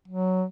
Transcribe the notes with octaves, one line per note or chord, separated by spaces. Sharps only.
F#3